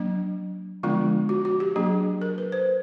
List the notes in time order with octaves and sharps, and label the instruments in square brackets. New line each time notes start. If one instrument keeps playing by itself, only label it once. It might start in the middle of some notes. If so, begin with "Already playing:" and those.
Already playing: [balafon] F#3 A#3 D4
D3 F3 G#3 B3 D4 F4
F#4
F#4
G4
F#3 A#3 D4 G#4
A#4
B4
C5